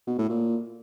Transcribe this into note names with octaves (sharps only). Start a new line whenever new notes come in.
B2
A2
A#2